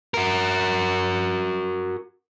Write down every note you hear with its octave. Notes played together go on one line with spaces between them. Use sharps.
F#4 A#4